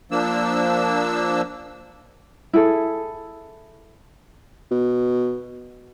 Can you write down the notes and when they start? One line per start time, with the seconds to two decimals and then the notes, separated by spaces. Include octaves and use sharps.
0.11 F3 A#3 D4 E6
2.53 E4 G#4 A4
4.71 B2